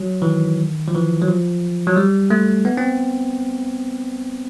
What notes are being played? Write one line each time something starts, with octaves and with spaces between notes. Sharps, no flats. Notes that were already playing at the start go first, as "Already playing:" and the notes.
Already playing: F#3
E3
D#3
F3
E3
F#3
F3
F#3
G3
A3
B3
C4